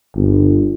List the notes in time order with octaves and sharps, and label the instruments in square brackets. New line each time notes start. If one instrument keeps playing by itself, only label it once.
[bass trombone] G1